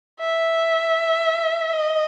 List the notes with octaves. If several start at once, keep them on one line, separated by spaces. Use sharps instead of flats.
E5
D#5